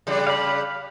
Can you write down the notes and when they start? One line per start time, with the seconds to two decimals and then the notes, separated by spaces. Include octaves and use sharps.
0.07 C#3 G3 D4
0.27 F5 B5